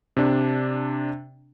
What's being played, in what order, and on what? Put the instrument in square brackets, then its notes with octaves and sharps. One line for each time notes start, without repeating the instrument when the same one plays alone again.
[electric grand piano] C3 D4